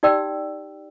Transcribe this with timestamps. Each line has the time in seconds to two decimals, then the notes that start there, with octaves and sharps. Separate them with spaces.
0.03 D#4 G4 D5 G5 E6